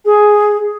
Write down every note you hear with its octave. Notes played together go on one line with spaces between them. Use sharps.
G#4